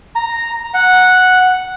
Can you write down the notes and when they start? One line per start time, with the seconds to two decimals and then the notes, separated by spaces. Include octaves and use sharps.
0.16 A#5
0.74 F#5